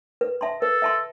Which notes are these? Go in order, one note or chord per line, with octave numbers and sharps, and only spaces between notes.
B4
E5 A5 C6
A4 B4
E5 A5 C6